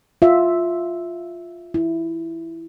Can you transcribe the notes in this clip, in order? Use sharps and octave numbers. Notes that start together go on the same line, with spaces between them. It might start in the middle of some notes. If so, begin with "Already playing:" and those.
F4 E5
E4